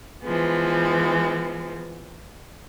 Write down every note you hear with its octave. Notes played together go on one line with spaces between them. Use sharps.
E3 F3 G#3 B3